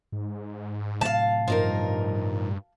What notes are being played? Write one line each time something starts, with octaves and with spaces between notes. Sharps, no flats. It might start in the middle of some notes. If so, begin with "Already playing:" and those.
G#2
A2 C3 F#3 F5 A5
G2 F3 D#4 A#4